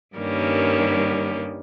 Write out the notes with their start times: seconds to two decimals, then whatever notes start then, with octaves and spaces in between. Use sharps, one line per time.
0.18 G2 D#3 G3 A#3 C#4